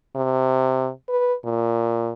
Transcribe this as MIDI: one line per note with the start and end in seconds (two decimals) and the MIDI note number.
0.16 0.89 48
1.09 1.34 71
1.45 2.13 46